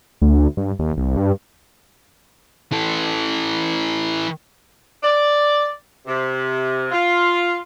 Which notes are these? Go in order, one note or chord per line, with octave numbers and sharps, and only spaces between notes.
D2
G2
D#2
C2
G2
E3 A4
D5
C3
F4